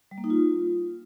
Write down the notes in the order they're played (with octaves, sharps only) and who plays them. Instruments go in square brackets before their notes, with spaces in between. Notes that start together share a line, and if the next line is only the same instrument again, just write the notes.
[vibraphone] G3
A#3
D#4
F4